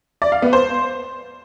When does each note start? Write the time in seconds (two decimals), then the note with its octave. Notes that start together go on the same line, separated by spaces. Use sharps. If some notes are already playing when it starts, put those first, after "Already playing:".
0.22 D5
0.32 F5
0.42 B3
0.53 C5